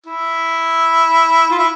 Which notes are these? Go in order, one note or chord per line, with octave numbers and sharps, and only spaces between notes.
E4
F4
E4